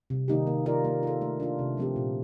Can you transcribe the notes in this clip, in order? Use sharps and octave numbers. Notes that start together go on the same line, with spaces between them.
C3
D#3 A#3 D#4 G4
A#3
F4 A#4 D5
A#3
F4 A4
A3
D4 F4
C3
F3 A3 C4 G4
A#2